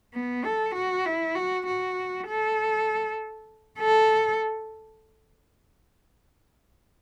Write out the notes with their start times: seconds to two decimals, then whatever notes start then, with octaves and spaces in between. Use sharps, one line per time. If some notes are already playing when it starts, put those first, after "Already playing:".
0.14 B3
0.44 A4
0.75 F#4
1.06 E4
1.35 F#4
1.66 F#4
2.27 A4
3.79 A4